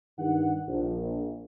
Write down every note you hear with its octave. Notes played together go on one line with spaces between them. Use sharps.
G2 D#3 D4 F#5
A#1